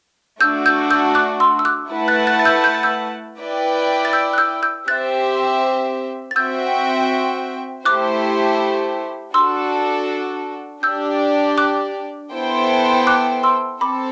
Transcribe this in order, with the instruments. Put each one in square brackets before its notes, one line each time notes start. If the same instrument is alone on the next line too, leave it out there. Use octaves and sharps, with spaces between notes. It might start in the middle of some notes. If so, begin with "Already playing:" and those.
[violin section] A3 D4 F#4 [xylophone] E6 G6
[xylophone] E6 G6
E6 G6
D6 F#6
C6 E6
E6
D6 F#6
[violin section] A3 E4 B4 F#5 A5
[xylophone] F#6 A6
F#6 A6
A6
E6 G6
G6
A6
E6 G6
[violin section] E4 B4 D5 G5
[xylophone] A6
E6 G6
F#6
E6 G6
E6 G6
[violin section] C4 G4 C5 E5 [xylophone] F#6 A6
[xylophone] A6
[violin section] C4 F#4 C5 E5 G5 [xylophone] E6 G6
[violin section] A3 E4 G4 C5 [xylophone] D6 F#6
[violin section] D4 F#4 A4 [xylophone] C6 E6
[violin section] D4 G4 D5 [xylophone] E6 G6
[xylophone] D6 F#6
[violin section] B3 E4 A4 C5 G5
[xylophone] D6 F#6
C6 E6
[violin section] C4 A4 [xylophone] B5 D6